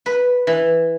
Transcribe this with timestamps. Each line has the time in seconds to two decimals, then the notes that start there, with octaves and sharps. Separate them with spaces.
0.06 B4
0.47 E3